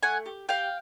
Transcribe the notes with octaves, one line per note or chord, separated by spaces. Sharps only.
A3 F#5 G#5
G4
G4 F5 G5